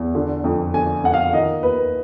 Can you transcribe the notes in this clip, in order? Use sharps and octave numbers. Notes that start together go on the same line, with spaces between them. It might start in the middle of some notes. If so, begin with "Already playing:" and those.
Already playing: E2
D3
F2
D3 G#5
F2 F#5
F5
D#3 D#5
D#2 B4